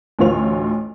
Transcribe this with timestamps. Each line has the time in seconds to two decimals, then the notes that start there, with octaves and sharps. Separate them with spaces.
0.19 A1 D2 F4 C#5 F7